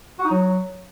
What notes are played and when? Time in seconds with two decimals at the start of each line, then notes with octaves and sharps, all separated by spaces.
0.19 F#4
0.25 D#4
0.31 F#3